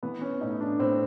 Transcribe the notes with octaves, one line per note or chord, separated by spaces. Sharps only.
E3 B3
C#4
A2 D#4
D4
A2 C4